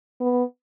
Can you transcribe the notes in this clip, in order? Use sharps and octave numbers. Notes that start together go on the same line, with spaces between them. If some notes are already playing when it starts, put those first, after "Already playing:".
B3